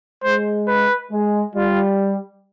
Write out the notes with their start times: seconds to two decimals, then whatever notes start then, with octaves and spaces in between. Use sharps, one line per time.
0.24 G#3 C5
0.68 B4
1.11 G#3
1.55 G3 F4